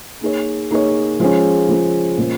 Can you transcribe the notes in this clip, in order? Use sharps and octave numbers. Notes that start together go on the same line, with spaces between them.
A#3 D#4 G#4 C#5
A#3 D#4 G#4 C#5
F3 G#3 C#4
F3 G#3 C#4
A#2 F3 G#3 C#4